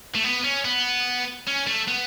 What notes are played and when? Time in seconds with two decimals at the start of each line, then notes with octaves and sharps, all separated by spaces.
0.15 A3
0.24 B3
0.44 C#4
0.65 B3
1.47 C#4
1.67 A3
1.88 B3